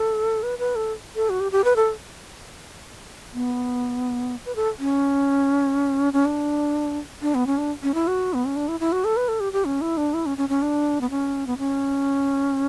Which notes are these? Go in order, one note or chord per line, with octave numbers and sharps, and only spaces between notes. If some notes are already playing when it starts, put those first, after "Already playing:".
Already playing: A4
B4
B4
A4
A4
F#4
G4
G4
B4
A4
B3
B4
A4
C#4
C#4
D4
D4
B3
C#4
D4
C#4
E4
F#4
B3
C#4
D4
E4
E4
F#4
A4
B4
A4
G4
G4
C#4
E4
D4
E4
C#4
C#4
C#4
D4
B3
C#4
B3
C#4